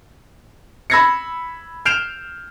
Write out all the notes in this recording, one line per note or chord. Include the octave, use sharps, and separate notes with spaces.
B5 E6 G#6 A#6 C7 C#7
F6 G6 C7 D7 E7 F7